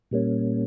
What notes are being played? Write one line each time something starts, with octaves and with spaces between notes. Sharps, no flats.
A#2 G3 A#3 C#4